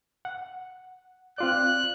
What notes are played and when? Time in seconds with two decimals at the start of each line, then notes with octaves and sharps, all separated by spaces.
0.25 F#5
1.38 C4 F4 D5 F#6